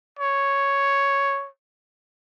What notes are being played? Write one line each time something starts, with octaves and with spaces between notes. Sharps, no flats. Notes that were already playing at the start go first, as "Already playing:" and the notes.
C#5